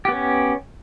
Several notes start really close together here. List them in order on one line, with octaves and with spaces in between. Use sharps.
G4 B3 C#4